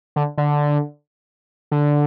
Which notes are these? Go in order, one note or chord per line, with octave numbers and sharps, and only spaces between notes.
D3
D3
D3